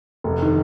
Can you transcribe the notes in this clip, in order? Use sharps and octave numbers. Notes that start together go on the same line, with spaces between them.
F1
D#3